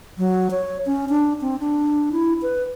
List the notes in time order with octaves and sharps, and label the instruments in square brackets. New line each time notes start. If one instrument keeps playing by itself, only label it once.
[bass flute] F#3
C#5
C#4
D4
C4
D4
E4
B4